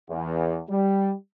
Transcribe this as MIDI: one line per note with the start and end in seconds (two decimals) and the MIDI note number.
0.10 0.60 40
0.70 1.13 55